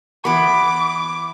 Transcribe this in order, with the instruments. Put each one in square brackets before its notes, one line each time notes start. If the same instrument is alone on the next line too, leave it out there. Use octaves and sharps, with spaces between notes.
[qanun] E3 B3 [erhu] D6